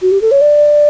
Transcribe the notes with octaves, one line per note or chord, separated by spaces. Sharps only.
F#4
G4
A4
C#5
D5